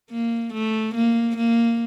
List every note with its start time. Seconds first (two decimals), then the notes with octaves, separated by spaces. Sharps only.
0.10 A#3
0.53 A3
0.95 A#3
1.37 A#3